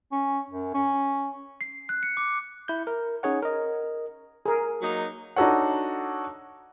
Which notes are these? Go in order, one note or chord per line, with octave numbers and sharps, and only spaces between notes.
C#4
F#2
C#4
C7
F#6
C#7
D6
E4 G6
A#4
C#4 D#4 G#4 C#5 F#5
A#4 D#5
G#4 A#4
F#3 A#3 D#4
D4 D#4 F#4 A4 C#5 F#5